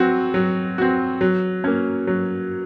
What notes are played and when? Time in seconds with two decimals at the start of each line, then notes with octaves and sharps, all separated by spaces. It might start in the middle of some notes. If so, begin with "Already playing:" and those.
Already playing: F#3 C4 F#4
0.34 F#3
0.78 C4 F#4
1.21 F#3
1.64 A#3 C#4
2.07 F#3